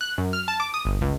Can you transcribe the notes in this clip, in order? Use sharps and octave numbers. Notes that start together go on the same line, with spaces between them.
F#6
F#2
F6
A5
D6
D#6
G1
C#2